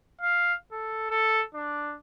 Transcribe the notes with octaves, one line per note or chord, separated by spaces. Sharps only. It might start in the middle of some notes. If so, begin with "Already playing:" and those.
F5
A4
A4
D4